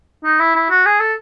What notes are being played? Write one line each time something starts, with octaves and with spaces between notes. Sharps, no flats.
D#4
E4
E4
F#4
G#4
A4